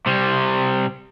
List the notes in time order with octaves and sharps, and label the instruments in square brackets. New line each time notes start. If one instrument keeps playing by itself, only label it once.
[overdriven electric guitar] C3 G3